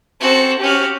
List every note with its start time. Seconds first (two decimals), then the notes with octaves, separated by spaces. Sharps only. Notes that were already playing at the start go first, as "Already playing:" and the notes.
0.21 C4 F#4 A4
0.61 C#4 F#4 G4 F6